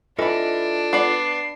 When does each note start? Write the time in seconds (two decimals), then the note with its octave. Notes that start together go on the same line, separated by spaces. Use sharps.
0.19 E3 D4 F4 A4 D#5 B5
0.93 B3 D5 C7